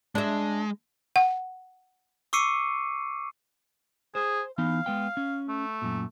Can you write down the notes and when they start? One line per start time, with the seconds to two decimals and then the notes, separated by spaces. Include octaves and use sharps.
0.15 G#3 D4 E5
1.16 F#5
2.33 C#6 D6 E6 C7 C#7 D#7
4.15 G#4 C5
4.58 E3 B3 D#4 F5
4.86 G#3 B3 G5
5.17 C#4
5.49 A3
5.82 F#2 A#2